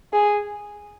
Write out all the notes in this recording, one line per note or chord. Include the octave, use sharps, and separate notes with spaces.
G#4